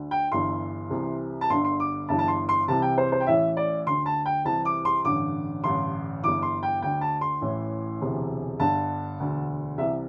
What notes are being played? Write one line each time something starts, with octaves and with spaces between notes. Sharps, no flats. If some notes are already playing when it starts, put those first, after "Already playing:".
Already playing: D2 D3
G5
G1 G2 E3 C6
C2 C3 E3
A5
G1 G2 D3 C6
C6
D6
G1 G2 E3 A5
A5
C6
C6
C2 C3 E3 A5
G5
C5
C5
G5
A1 A2 E3 E5
D5
D2 D3 C6
A5
G5
C2 C3 E3 A5
D6
C6
A1 G2 D3 D6
A1 G2 D3 C6
G1 G2 E3 D6
C6
G5
D2 D3 G5
A5
C6
A1 A2 E3
E1 D2 C3 E3
G1 G2 D3 A5
E1 D2 D3
C2 C3 E3 E5